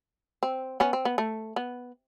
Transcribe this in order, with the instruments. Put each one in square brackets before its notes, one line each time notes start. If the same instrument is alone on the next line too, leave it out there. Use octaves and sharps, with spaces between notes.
[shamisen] C4
B3 C#4
C4
B3
A3
B3